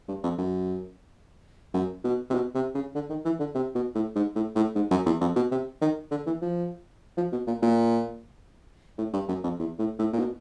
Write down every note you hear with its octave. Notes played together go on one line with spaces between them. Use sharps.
G2
F2
F#2
F#2
B2
C3
B2
C3
C#3
D3
D#3
E3
D3
C3
B2
A2
G#2
A2
A2
G#2
F#2
E2
F2
B2
C3
D#3
D3
E3
F3
F3
B2
A#2
A#2
A2
G2
F#2
F2
E2
A2
A2
A#2
B2